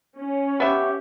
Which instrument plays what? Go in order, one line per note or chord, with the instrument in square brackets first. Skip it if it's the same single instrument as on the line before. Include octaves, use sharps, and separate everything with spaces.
[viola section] C#4
[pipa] B3 E5 [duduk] G4